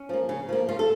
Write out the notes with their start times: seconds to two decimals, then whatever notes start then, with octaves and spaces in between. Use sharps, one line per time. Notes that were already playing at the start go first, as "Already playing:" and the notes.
Already playing: C#4
0.09 F3 A#3
0.29 C#3
0.49 F3 A#3
0.68 C#3 F4
0.79 A4